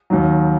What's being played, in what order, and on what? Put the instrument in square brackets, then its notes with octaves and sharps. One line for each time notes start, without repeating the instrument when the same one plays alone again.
[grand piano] D#2 D#3 F#3